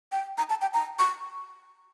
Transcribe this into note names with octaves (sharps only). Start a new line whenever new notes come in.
G5
A#5
A5
G5
A#5
C#6